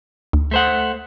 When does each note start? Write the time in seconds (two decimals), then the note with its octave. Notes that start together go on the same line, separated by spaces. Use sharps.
0.33 D2
0.51 A3 C5 F#5